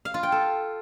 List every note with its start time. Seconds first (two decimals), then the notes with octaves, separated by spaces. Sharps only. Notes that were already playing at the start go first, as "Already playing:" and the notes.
0.05 F5
0.14 F4
0.23 G5
0.32 A4